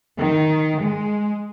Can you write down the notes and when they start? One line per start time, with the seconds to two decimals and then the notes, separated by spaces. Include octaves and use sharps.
0.18 D#3
0.81 G#3